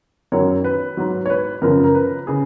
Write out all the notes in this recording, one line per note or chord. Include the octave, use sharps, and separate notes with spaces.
F#2 D#3 F#3 C#5
B4
G#2 F#3
C#5
B4
F#2 C#3 F3 A#4
A#4
B4
C#3 G#4